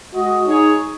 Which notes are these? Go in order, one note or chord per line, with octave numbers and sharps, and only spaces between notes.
G#3 F#4 D#5
G#3 D#4 G#4 C#5